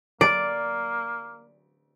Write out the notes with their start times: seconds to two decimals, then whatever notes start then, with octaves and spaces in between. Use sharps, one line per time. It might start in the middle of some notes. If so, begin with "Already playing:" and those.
0.21 A#3 D5 D7